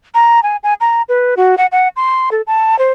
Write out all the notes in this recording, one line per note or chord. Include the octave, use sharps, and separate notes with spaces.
A#5
G#5
G#5
A#5
B4
F#4
F#5
F#5
C6
A4
A5
C5